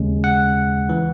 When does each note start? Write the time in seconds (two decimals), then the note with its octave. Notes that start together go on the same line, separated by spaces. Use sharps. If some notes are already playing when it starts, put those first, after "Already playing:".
Already playing: D#2 C#3 G#3 C#4
0.24 F#5
0.89 E3